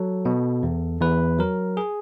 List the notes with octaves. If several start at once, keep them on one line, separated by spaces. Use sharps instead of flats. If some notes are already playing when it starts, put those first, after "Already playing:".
Already playing: F#3 A4
B2
E2
E2 B4
F#3 A#4
G#4